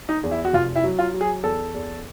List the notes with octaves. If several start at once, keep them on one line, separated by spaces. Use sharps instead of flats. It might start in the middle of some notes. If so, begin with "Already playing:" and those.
D#4
E2
E4
F#4
F1 F4
E4
F#3
F4
F#3
G#4
E2 A4
E2